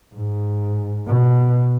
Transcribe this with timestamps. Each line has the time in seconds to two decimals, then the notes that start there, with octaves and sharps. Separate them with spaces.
0.15 G#2
1.07 B2